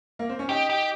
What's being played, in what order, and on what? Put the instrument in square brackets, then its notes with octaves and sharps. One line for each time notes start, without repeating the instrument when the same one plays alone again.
[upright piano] A#3
C4
C#4
[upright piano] D#4 [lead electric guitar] G4
[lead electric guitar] G4